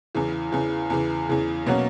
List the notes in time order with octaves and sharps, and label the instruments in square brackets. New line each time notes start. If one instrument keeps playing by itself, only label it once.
[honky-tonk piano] E2 C#3 E3
E2 C#3 E3
E2 C#3 E3
E2 C#3 E3
B2 F#3 A#3 C#4 F#4